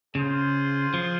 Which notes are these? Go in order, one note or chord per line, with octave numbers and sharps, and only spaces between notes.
C#3 F4 G#4 C5
F3